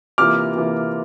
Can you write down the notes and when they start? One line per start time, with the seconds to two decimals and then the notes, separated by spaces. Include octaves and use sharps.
0.18 C3 E3 A#3 F4 D6 F6
0.56 C3 E3 A#3 F4